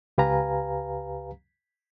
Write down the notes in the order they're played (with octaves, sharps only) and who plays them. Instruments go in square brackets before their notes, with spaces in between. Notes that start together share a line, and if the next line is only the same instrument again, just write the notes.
[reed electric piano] C#2 G4 B4 F5 G#5 A#5